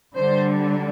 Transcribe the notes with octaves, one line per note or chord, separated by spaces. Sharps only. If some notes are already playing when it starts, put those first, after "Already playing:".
D3 G3 D4 C5